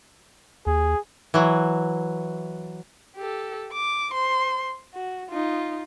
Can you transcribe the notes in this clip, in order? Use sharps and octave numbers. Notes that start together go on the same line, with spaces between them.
D#2 G#4
E3 F#3
G4 A4
D6
C5 C6
F#4
D#4 F4